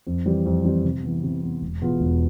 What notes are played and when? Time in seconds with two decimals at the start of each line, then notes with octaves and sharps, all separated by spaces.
0.07 F2
0.26 E3 G3 C4 G4
0.46 F2
0.65 E3 G3 C4 G4
0.84 C3
1.03 E3 B3
1.23 C3
1.42 E3 B3
1.62 E1
1.81 E2 B2 B3 F4
2.00 E1